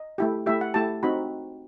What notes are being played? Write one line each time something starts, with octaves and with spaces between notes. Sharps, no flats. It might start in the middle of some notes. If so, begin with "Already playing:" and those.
Already playing: D#5
A3 E4 G4
A3 E4 G4 E5
F#5
A3 E4 G4 A5
C4 D#4 F#4 B5